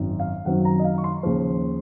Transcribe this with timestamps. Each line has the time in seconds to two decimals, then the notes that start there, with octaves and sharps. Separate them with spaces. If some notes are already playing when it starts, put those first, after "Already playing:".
Already playing: G#1 F#2 D#3
0.20 F5
0.45 F#2 D#3 F#3 C4 F#5
0.65 A#5
0.79 D#5
0.84 F5
0.98 C#6
1.04 C6
1.23 D#2 C#3 F3